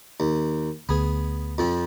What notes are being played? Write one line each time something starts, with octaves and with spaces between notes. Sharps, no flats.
D#2
D2 B3 G#4
F2 F3 C4